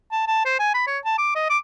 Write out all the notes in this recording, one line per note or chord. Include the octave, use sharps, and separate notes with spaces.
A5
A5
C5
G#5
B5
C#5
A5
D6
D#5
D6